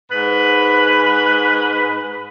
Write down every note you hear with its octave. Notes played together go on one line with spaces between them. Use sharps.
G#2 B4